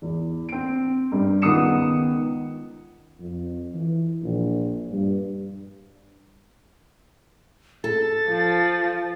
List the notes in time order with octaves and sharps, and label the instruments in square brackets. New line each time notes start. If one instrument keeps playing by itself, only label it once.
[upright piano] E2
C4 D7
G2
C#2 D#3 B3 D#6 C#7 E7
[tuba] F2
E3
A#1
G2
[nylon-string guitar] A4 [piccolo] A6
[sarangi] F3